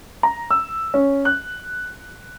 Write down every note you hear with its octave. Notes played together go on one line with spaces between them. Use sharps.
A#5
E6
C#4
F#6